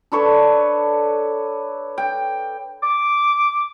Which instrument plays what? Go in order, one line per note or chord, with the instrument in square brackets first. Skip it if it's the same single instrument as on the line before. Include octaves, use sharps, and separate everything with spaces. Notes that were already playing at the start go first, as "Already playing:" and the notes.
[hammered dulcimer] D4 A4 B4 C#5
G5
[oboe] D6